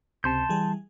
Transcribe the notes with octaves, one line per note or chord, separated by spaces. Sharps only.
C#2 C3 A5 C6 G6
E3 G3 G#4